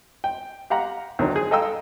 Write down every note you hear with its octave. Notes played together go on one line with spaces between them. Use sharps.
G5
G4 F5 F#5 A#5
D2 D#3 F#3
G#4
A4 D#5 F5 G5 A#5 E6